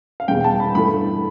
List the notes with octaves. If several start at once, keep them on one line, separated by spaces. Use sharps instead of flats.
F5
E2 B2 G3 G5
A5
B5
G2 E3 A3 B5